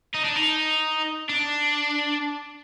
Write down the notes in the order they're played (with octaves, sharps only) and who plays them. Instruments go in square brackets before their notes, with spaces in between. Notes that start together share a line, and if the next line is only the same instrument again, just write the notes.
[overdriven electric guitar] D#4
D4
D#4
D4